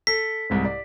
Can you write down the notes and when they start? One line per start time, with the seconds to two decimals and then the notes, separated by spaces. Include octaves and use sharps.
0.07 A4 B6
0.50 C2 G#2 C3
0.65 D5